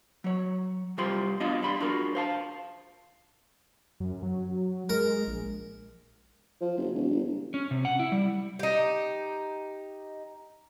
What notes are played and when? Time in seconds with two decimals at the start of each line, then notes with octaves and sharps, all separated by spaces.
0.24 F#3 C#5
0.98 C2 G3 F4 G4 C5 C6
1.40 B3 D4 F4 D#5 F5
1.63 G3 B5 C6
1.80 D4 F4 F#4 G#4 A#4
2.15 C5 F5 A5
4.00 F#2
4.23 F#3
4.89 G#3 A#4
5.27 A#1
6.61 F3
6.77 F#1
6.94 E1
7.11 G1
7.54 C#4
7.71 C3
7.85 F#5
8.00 E4
8.12 G3
8.59 D#4 G4